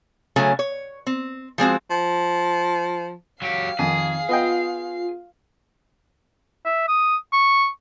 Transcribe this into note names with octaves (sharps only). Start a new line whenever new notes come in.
C#3 F#3 A3 C#4
C#5
C4
F3 G#3 C4 F#4
F3
F#3 G4 F5 C7
F2 D#3 G#4
B3 F4 D#5 G5
E5
D#6
C#6